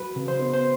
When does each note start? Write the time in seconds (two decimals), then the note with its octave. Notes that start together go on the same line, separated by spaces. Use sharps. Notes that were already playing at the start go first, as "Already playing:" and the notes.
Already playing: F#3 B4
0.16 C#3
0.28 C5
0.39 B3
0.54 C5